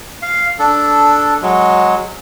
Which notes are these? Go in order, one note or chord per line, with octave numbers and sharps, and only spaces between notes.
F5
D4 A4
F#3 G#3